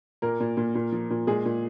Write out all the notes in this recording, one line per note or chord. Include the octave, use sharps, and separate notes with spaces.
A#2 A#3 A#4
A#2
A#2
A#2
F3
A#2
A#2 G#3 G#4
A#2